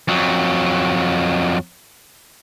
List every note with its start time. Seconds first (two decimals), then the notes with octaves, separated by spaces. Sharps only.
0.08 F2 F#3